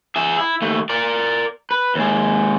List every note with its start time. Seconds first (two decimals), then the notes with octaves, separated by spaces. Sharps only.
0.16 G#4 E5
0.39 E4
0.62 D#2 A3
0.90 A#4 D5
1.71 B4
1.95 D#2 G#3